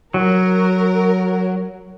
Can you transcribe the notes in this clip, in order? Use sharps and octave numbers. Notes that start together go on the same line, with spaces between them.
F#3 A#4